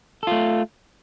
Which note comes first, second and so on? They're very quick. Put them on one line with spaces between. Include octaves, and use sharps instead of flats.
A4 F4 A3